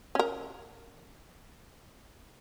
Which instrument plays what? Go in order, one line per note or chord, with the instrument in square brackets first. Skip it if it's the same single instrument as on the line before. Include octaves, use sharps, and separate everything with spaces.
[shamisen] C#4 A#4